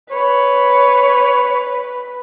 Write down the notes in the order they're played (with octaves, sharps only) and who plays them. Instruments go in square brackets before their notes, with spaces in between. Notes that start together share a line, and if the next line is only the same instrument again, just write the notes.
[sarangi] B4 [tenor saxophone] C#5